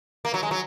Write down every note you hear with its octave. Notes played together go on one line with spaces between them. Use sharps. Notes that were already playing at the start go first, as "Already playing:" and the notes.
A#3
F#3
G#3
F#3